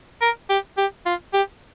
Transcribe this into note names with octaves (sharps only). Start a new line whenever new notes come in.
A#4
G4
G4
F4
G4